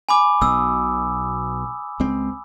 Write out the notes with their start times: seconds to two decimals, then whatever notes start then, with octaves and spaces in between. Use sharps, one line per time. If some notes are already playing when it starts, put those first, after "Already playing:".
0.09 G#5 B5 D6
0.41 B1 B2 D#6 E6
2.00 C#2 G#3 C4